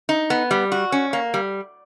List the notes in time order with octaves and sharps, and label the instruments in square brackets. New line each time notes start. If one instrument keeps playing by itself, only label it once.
[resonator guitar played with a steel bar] D#4
B3
G3
F#4
C#4
A#3
G3